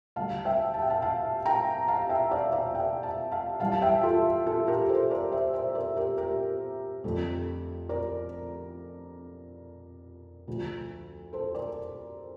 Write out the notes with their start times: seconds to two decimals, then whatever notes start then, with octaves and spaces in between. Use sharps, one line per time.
0.16 D2 D3 G3 F5 A5
0.45 E5 G5
0.74 A5
0.82 G5
0.90 F5 A5
1.02 F5 A5
1.46 G5 A#5
1.88 F5 A5
2.09 E5 G5
2.31 D5 F5
2.52 D5 F5
2.75 E5 G5
3.03 F5 A5
3.31 F5 A5
3.60 G2 E3 G3 F5 A5
3.72 A5
3.82 E5 G5
4.03 F4 A4
4.46 F4 A4
4.67 G4 A#4
4.88 A4 C5
5.10 A#4 D5
5.32 C5 E5
5.53 C5 E5
5.75 A#4 D5
5.96 G4 A#4
6.17 G4 A#4
7.04 F2 D3 A3
7.89 A#4 D5
10.47 D2 D3 F3
11.33 A4 C5
11.55 A#4 D5